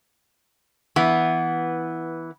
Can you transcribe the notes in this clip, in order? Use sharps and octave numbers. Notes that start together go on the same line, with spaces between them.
E3 B3